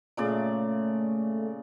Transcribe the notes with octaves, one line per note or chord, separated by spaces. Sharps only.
A#2 C#3 A3 D5